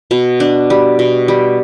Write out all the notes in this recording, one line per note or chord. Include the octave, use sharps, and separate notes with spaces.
B2
D4
G3
B2
G3